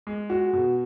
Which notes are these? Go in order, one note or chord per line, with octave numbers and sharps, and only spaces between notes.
G#3
F#4
B2